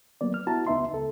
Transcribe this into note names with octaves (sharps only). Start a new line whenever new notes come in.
F#3 A#3 B3 D5
F6
B3 E4 F#4 A5 A#5
C#2 B3 D#4 E5 C6
C#2 A4